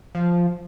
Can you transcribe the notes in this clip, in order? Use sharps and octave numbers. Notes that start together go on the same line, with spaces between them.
F3